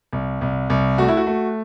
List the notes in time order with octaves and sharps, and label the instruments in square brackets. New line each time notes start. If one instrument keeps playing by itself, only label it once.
[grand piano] C2
C2
C2
A3 F#4
E4
F#4
A3